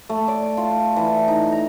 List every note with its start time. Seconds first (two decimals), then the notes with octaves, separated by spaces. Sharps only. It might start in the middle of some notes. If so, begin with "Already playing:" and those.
0.09 A3
0.28 D5
0.57 F4
0.96 E3
1.28 D#4
1.52 A#5